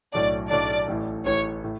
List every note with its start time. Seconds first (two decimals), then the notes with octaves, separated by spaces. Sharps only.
0.13 B1 A2 F#3 A3 D4 D5
0.50 B1 A2 F#3 A3 D4 D5
0.88 A1 A2 E3
1.26 A1 A2 E3 C#5
1.64 A2